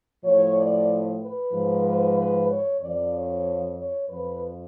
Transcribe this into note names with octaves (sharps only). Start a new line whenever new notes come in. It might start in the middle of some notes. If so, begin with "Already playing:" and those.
A2 F3 C#5
D5
B4
G#2 F3
B4
B4
C#5
F2 F3 D5
C#5
C#5
F2 F3 B4